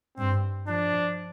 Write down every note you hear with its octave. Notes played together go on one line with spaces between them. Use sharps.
G2 C4
F3 D4